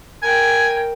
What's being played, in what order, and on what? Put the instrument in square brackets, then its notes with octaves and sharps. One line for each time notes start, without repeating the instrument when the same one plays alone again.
[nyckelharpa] A#4 G5 [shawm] G#5